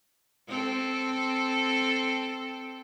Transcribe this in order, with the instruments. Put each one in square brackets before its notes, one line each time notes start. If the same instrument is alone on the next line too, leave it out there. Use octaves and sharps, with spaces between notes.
[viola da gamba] C4 A4